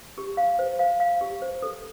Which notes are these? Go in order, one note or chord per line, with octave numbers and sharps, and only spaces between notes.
G4
F5
C5
F5
F5
G4
C5
A4